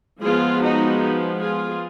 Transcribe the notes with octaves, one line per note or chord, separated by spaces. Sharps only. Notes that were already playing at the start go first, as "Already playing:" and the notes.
F3 G#3 B3 F4 G#4
D#4 F#4
F4 G#4